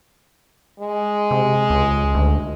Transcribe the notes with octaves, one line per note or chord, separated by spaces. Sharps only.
G#3
C3
C#2
D2